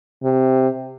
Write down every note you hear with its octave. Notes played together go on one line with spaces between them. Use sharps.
C3